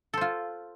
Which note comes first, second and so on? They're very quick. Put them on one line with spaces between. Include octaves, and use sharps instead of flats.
A4 C5 F4